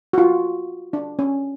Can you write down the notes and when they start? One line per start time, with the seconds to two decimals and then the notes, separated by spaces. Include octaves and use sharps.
0.13 F#4
0.18 F4
0.93 D4
1.19 C#4